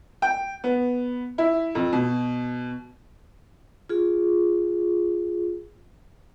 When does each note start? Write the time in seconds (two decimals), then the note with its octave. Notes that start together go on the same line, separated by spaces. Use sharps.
0.22 G5
0.64 B3
1.38 E4
1.75 F2
1.93 B2
3.89 F4 G#4